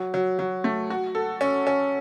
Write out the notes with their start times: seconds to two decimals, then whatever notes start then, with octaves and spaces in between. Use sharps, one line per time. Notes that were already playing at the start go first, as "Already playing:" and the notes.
Already playing: F#3
0.14 F#3
0.39 F#3
0.64 A3
0.90 F#4
1.15 A4
1.41 C#4
1.67 C#4